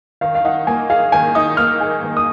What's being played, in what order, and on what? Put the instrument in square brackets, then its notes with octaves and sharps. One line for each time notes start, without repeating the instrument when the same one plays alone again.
[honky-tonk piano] D#3 [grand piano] F5
[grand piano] F5
[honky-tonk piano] D#4 [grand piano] F#5
[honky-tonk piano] A#3 [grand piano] G#5
[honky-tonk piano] G#4 [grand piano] F5
[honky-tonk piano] D#3 [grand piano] G#5
[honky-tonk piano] D#4 [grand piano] D#6
[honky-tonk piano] A#3 [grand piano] F6
[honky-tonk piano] G#4
D#3
[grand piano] D#6